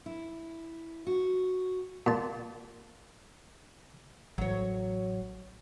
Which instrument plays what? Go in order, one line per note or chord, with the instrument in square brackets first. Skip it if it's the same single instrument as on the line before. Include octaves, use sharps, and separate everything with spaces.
[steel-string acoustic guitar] E4
F#4
[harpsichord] A#2 A5
[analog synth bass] A1 [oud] F#3 C#5